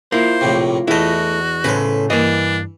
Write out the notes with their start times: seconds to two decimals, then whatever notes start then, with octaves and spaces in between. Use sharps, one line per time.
0.12 A#3 E4 F4 C5
0.41 A#1 A2 C3
0.88 E2 A3 E4 F#4 D#5
1.64 A2 C#3 A4 B4 C5
2.10 G2 E3 A#3 D4 D#5